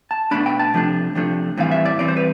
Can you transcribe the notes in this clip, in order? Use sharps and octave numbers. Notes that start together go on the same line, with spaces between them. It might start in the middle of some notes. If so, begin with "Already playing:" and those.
A5
B2 A3 D4 B5
G5
A5
C3 F3 A3 D4
C3 F3 A3 D4
A2 E3 G3 C4 F5
E5
D5
A2 E3 G3 C4 D5
C5
B4